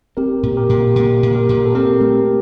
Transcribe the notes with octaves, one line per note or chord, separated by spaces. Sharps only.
C4 G4 A#4
A#2
G4 A#4
A#2
A#2
A#2
G4 A#4
A#2
A4
C4 G4 A#4
A3